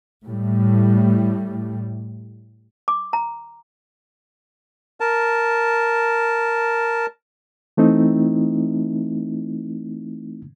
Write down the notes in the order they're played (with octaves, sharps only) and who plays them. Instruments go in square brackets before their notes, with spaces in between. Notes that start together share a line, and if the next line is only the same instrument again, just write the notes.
[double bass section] A2 G3
[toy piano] D6
A#5
[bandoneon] A#4 A5
[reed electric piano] E3 A3 C4 D#4 E4